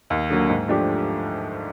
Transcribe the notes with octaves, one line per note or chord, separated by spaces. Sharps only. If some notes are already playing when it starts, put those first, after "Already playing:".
D#2
D3 F#3 A#3
G#2
F3 A3 D4 G4